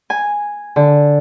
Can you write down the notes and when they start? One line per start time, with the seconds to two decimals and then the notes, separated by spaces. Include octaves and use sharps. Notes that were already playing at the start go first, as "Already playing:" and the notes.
0.10 G#5
0.76 D3